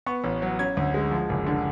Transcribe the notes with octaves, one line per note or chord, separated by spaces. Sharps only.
B3 C#6
A1
F#3
C#4 G#6
D2
G#3
F3
F#1
D3